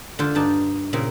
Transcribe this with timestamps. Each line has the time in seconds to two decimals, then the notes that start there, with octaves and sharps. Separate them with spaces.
0.19 D3 F4 C5
0.35 G2 D4 D#4 A5
0.93 A#2 C#3 A#3 C4